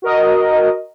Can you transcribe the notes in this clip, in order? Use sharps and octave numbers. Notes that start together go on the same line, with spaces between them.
F#4 A#4 D#5